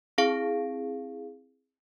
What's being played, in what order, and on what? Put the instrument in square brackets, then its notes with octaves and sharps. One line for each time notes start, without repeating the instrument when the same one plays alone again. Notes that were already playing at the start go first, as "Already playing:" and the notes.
[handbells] C4 E4 G#4 F5 D7